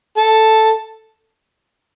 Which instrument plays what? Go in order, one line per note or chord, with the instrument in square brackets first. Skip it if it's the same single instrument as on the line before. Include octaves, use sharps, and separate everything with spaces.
[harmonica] A4